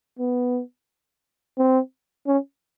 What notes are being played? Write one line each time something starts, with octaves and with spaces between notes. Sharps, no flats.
B3
C4
C#4